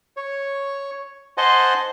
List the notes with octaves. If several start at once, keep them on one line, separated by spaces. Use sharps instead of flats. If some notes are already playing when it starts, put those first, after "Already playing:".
C#5
C5 D#5 F#5 G#5 A5 C6